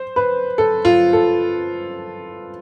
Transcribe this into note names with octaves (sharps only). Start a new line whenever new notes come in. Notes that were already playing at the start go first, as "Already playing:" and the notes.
Already playing: C5
B4
A4
F4
A4